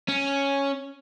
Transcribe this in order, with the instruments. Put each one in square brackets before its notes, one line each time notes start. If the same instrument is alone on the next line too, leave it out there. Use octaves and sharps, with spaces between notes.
[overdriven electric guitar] C#4